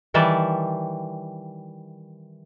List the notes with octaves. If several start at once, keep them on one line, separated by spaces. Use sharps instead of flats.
D#3 E3 G3 E5 A5